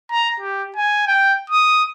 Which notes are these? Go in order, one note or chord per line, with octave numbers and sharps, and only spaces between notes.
A#5
G4
G#5
G5
D#6